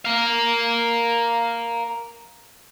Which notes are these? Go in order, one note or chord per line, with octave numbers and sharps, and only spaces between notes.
A#4 F5